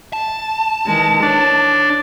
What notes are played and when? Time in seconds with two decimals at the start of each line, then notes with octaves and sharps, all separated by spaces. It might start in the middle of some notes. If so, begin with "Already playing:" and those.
0.13 A5
0.86 D#3 E3 G#3
1.22 D4 C#5